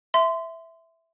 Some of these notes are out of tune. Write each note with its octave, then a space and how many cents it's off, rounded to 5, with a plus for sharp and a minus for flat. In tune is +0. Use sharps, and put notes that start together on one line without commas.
E5 +0 C6 -20